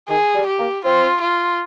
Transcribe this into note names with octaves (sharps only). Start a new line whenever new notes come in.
D#3 G#4
G3
G4
A#3
C4 F4
F4